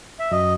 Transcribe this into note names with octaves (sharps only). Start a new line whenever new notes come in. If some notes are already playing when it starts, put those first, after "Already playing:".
E5
F#2 D#5